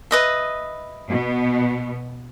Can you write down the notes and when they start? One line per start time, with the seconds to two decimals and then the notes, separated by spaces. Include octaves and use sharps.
0.11 B4 D#5 E5
1.09 B2 B3